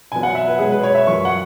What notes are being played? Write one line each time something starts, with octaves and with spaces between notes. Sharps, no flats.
B2 F#3 B3 G#5
F#5
E5
B4
B2 G#3 C#4 G#4
B4
C#5
E5
F#2 F#3 C#4 C#6
F#5